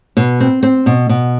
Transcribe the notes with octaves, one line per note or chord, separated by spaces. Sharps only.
B2
C4
C4
B2
B2